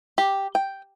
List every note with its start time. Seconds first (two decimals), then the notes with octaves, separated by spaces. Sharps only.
0.18 G4
0.55 G5